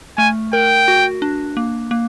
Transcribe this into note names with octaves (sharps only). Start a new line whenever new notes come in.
A3 G#5
A#4 G5
F#4
D4
A#3
A#3